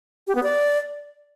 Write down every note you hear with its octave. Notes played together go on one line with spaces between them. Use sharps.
G4
B3
D5